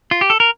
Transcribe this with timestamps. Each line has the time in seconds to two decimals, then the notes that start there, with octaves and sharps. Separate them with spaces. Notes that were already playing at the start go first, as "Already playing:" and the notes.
0.11 F4
0.21 G4
0.30 A4
0.40 A#4